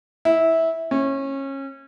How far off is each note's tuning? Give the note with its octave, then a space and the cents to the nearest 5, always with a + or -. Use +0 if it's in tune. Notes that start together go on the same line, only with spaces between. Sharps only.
E4 -15
C#4 -25